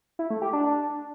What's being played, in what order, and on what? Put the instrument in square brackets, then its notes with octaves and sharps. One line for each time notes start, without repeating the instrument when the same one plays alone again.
[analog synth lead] E4
A3
G4
D4